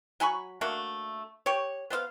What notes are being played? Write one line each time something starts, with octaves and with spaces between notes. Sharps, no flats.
F#3 G#5 B5 C#6
A3 A#3 D4 F#4
G4 C#5
B3 C5 D#5 F5